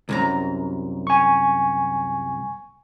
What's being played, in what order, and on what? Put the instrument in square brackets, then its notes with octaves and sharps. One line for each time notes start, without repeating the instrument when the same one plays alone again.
[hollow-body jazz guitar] C2 F#2 A#5
[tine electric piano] G#5 C#6